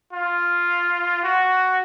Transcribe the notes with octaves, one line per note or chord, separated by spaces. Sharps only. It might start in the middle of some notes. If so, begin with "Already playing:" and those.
F4
F#4